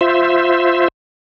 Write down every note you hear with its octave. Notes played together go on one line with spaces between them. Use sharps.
F4 C5 E5